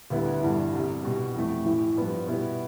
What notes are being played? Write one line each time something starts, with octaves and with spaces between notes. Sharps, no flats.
D2 D3 G3 B3 E4
G1 G2 E3
C2 C3 G3
C2 B2 G3
F2 E3 A3
A1 A2 E3
G2 F3 B3
B2 G3 B3 E4